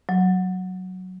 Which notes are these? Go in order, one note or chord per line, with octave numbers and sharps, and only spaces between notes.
F#3